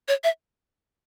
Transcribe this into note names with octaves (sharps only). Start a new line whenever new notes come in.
C#5
E5